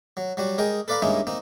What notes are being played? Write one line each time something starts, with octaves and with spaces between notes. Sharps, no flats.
F#3
F#3 G3 F#4
G#3 G#4 A#4 D#5 G5
A4 B4 D5 F5 A#5 B5
G2 G#3 A#3 C#4 D#4 E4
A#3 C4 D#4